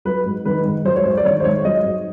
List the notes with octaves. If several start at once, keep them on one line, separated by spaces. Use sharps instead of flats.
F#3 B4
G#2
D#3 B4
G#2
F#3 C5
C#5
G#2 C5
D5
D#3 C#5
C5
G#2 C#5
F#3 D#5
G#2